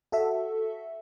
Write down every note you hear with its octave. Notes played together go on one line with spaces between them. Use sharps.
F#4 A4 E5